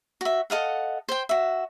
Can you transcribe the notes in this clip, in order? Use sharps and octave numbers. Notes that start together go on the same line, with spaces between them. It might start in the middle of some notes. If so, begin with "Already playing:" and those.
F#4 E5
A4 D#5 F5 F#5
C5 G5
F#4 E5